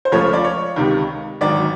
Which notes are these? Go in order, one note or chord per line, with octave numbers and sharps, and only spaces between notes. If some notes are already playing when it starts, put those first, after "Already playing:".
C5
C#2 C#3 F3 A3 C#5
D5
C#5
C#2 C3 D#3
G#1 G#2 D#3 F#3 D5